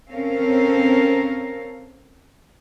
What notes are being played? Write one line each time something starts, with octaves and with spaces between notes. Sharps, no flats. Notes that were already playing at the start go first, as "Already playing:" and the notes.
C4 C#4 A4 A#4 F5